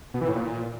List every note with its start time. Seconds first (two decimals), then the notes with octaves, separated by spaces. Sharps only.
0.14 B2
0.21 E3
0.28 A2
0.36 A#2